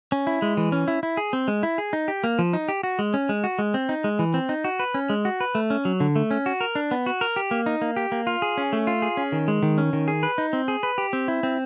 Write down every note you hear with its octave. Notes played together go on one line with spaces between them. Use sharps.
C#4
E4
G#3
E3
C#4
E4
E4
G#4
C4
G#3
E4
G#4
D#4
G4
A#3
F3
D#4
G4
F#4
G#3
C#4
G#3
F#4
G#3
C4
D#4
G#3
E3
C4
D#4
F#4
B4
C#4
G#3
F#4
B4
A3
C#4
F#3
D3
A3
C#4
F#4
A#4
D4
B3
F#4
A#4
G4
A#3
D#4
A#3
G4
A#3
F4
G#4
C#4
A3
F4
G#4
C#4
D#3
G#3
D#3
C#4
D#3
G#4
B4
D#4
C4
G#4
B4
G4
C4
E4
C4